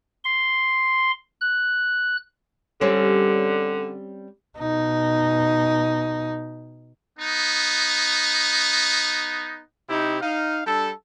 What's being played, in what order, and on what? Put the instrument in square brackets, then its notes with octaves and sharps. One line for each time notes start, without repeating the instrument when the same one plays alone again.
[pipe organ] C6
F#6
[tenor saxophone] D3 [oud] G3 C4 C#4
[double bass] B2 D#4
[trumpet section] B3 D#4
[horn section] C3 D#4 E4 G4
D#4 F5
G3 D4 A4